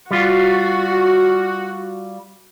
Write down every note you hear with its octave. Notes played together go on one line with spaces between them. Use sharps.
G3 F4 F#4